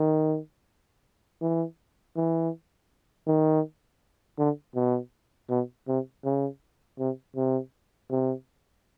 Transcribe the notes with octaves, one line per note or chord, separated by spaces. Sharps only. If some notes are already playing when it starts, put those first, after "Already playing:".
Already playing: D#3
E3
E3
D#3
D3
B2
B2
C3
C#3
C3
C3
C3